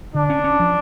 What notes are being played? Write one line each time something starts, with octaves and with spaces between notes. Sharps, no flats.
D3 D4
C#4
C#4
F3